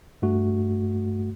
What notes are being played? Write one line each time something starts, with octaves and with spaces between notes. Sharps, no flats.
G2 A3 F#4